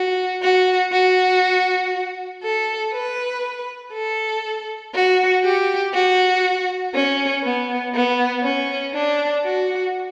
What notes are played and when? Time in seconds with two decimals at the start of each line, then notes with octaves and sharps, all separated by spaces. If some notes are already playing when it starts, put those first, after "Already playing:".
Already playing: F#4
0.42 F#4
0.92 F#4
2.43 A4
2.93 B4
3.93 A4
4.94 F#4
5.43 G4
5.93 F#4
6.94 C#4
7.43 B3
7.94 B3
8.43 C#4
8.94 D4
9.44 F#4